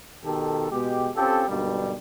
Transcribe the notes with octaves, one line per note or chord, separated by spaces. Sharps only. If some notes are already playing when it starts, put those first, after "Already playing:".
B2 D#3 G4 A4
B2 G#3 G4
C4 C#4 F4 G4 A4
B1 G2 B2 D3 G3 A#3